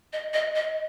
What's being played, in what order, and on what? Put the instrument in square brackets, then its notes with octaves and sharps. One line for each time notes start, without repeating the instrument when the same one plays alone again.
[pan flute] D#5
D#5
D#5